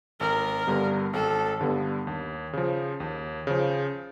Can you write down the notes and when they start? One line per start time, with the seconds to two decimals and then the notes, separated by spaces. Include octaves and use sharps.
0.21 G#1 A#4
0.67 G2 D3 G3 B3
1.13 G#1 A4
1.60 G2 D3 G3 B3
2.07 D#2
2.53 C#3 F3
3.00 D#2
3.47 C#3 F3